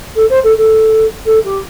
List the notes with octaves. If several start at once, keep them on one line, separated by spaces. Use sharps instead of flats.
A4
C5
A4
A4
A4
G4